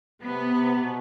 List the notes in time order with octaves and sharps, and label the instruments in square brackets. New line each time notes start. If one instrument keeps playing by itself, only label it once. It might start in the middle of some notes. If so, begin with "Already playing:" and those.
[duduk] C3 [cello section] B3
[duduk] C3
C3
B2